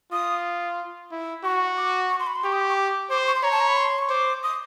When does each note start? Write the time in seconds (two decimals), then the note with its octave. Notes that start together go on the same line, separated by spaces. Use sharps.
0.12 F4 D#6
1.12 E4
1.44 F#4 C#6
1.77 D6
2.10 C#6
2.20 C6
2.27 B5
2.35 C6
2.44 G4 C#6
2.52 D#6
2.61 D6
2.69 C#6
2.76 D6
3.10 C5 D6
3.18 C6
3.27 C#6
3.35 C6
3.43 C#5 A#5
3.52 A5
3.60 A#5
3.68 B5
3.77 C6
3.99 C#6
4.09 C5 D6
4.43 D#6